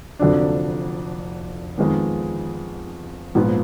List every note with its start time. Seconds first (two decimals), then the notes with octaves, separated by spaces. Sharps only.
0.19 F1 F2 D3 F#3 D4
1.78 F2 D#3 G#3 B3
3.35 A#1 G#2 F3 B3 F4